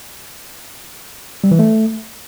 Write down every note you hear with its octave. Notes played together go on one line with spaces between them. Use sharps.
G3
E3
A3